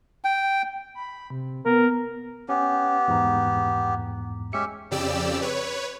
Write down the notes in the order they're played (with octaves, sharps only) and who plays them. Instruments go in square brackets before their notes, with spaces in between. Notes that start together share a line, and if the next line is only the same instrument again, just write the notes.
[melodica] G5
[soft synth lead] B5
C3
[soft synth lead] B3 [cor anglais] A#4
[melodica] B3 G4 [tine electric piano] C#4
[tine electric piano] E2 G#2 A#5
[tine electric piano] G#3 C#7 [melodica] C#4 G4 E5
[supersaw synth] F2 C#3 G4 D5 E6
B4 C#5